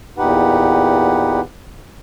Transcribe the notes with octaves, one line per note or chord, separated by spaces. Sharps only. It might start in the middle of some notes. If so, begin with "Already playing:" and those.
E2 A#2 D#4 G4 B4 F#5